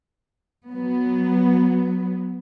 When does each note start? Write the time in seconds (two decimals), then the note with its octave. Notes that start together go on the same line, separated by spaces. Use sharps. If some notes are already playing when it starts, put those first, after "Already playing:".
0.69 F#3 B3